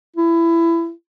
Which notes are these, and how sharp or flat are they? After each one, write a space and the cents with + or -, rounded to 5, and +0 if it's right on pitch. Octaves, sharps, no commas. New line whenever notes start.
E4 +20